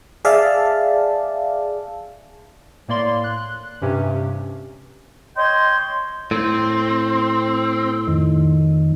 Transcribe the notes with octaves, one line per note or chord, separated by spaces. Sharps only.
G#4 D5 E5 F5 A5
A2 A#3 D5 C6
F#6
G2 C3 C#4 G4
C#5 D#5 G5 C6
A2 C4
F2 D#3